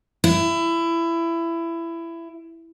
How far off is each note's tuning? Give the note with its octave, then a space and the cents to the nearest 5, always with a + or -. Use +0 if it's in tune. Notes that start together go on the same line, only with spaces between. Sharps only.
E4 +20